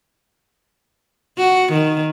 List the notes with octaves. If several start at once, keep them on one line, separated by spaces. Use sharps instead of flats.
F#4
D#3